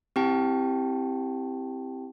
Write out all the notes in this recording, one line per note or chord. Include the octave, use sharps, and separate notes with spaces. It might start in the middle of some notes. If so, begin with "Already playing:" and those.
C4 E4 G4 G5 A5